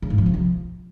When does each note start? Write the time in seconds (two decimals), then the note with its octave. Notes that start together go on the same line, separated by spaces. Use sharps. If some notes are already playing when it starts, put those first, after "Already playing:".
0.02 C#3
0.10 G#2
0.18 F3
0.26 C3
0.34 F3